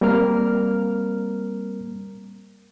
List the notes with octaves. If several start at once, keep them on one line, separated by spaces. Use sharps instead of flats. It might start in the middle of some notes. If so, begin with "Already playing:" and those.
G3 A#3 C4 A#4 A#5 F6